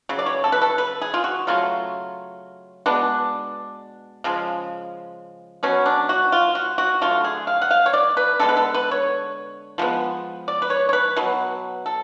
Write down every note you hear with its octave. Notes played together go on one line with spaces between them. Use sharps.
C#3 F#3
D5
C#5
A4
B4
A4
B4
G#4
F4
F#4
C#3 F#3 A3 F4
B2 G#3 B3 D4
C#3 F3 G#3
B2 F#3 B3 C#4
D4
F#4
F4
F#4
F#4
D3 F#3 A3 F4
G#4
F5
F#5
F5
C#5
D5
B4
D3 G#3 B3 A4
B4
A4
B4
C#5
F3 G#3 B3
D5
B4
C#5
C#5
B4
B2 F#3 B3
A4